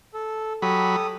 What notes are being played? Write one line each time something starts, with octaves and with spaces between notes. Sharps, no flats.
A4
F#3 G4 A4 B5 D#6